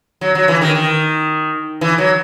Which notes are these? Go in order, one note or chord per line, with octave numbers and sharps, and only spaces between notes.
F#3
F#3
E3
D#3
D#3
E3
F#3